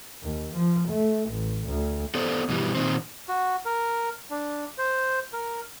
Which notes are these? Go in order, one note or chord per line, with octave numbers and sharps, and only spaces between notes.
D#2
F3
A3
A1
D2
B3 A4 C5 D5
G2 B2 E3 G3
A#2 D#3 C4
F#4
A#4
D4
C5
A#4